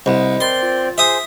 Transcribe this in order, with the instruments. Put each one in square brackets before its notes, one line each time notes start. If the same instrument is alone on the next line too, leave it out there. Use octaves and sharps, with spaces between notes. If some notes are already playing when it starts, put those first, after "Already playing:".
[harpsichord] C2 [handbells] C5 D#5 B5 [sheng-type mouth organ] F#5
[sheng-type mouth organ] C4 D5 [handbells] A#4 [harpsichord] C6
[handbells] F4
[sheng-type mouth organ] G#4 C5 [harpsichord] E5 D#6